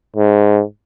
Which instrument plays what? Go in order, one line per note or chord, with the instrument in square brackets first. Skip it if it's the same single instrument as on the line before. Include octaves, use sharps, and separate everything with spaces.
[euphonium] G#2